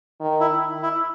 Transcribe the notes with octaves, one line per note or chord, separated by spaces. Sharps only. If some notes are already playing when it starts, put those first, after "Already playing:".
D#3
E4
E4